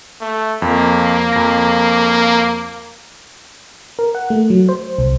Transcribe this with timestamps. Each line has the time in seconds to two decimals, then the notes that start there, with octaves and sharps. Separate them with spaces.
0.21 A3
0.62 F2 A#3
1.33 F2 A#6
3.99 A#4
4.15 F#5
4.30 A3
4.50 F#3
4.69 C5
4.98 C2